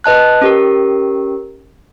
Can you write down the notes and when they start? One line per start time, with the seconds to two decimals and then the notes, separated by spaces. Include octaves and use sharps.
0.04 B4 D#5 A5 F#6
0.41 C#4 G4 A#4